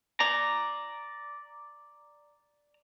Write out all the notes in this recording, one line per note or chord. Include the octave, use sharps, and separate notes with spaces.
D5 A#5